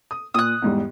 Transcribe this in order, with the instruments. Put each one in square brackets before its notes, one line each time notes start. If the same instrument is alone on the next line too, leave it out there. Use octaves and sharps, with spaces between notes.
[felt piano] D#6
[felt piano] A#2 [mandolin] D#6 F#6
[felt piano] E2 G#2 G3